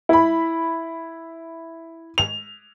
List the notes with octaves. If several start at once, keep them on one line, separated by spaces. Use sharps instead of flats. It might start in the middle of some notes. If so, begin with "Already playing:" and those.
E4 B5
F7